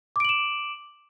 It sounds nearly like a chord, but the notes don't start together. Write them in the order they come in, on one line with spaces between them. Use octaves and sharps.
D6 D7 F#7 E7